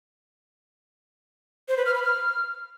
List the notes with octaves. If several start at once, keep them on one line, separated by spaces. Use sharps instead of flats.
C5
B4
F6
B5
F6